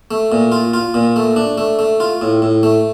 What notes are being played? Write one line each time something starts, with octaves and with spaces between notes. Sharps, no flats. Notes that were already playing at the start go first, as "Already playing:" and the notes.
A3
A#2
F4
F4
A#2
A3
D4
A3
A3
F4
A2
A2
A3